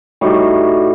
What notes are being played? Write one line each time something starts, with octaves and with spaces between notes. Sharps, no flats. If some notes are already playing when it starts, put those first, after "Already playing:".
A2 G3 D#4 F#4